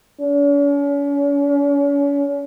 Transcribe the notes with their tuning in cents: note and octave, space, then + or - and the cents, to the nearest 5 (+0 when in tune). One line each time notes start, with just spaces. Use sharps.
C#4 +40